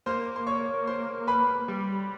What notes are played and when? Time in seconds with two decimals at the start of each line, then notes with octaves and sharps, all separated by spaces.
0.06 A#3 C5 C6
0.36 C6
0.47 C#5 C#6
0.87 C5 C6
1.27 B4 B5
1.68 G3